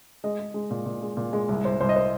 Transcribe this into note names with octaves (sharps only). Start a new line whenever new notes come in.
G#3 D#5
G#3
G#3
A#2
A#2
G#3
A#2
G#3
C2
C2 C5
C2 C5
D#5
C5